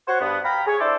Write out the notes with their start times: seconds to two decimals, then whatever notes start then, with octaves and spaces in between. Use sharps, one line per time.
0.08 F#4 C5 C#5 F#5
0.20 G2 B3
0.44 F5 G5 A#5 B5
0.66 G#4 C#5
0.80 D4 E4 A4 C5 D5